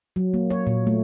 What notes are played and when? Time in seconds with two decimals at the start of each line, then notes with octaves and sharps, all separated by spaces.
0.16 F#3
0.34 A#3
0.50 C#5
0.67 A#2
0.87 A3